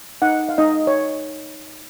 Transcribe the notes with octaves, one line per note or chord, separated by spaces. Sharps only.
D#4 F#5
F5
D#4 D#5
C#5